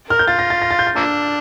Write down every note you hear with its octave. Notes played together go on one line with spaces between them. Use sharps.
A#4 F6
G6
F4 A6
A#6
A6
A#6
A6
G6
A6
F3 A#3 D4 E6